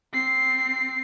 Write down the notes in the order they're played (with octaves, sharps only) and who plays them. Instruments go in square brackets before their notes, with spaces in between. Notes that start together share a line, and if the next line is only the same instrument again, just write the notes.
[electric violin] C4 C7